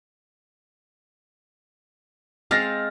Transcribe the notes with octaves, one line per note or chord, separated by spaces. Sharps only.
G#3 C4 F5 F6 A6 A#6